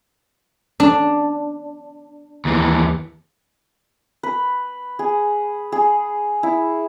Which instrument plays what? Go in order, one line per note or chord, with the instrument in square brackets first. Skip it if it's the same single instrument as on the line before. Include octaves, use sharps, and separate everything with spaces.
[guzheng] D4
[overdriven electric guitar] D#2 E3
[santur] B4
G#4
G#4
E4